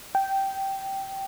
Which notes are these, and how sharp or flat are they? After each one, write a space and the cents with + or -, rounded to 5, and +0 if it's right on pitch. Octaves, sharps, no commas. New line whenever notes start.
G5 -10